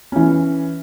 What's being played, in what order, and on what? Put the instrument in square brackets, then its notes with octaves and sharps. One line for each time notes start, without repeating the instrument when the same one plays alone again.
[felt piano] E3 C#4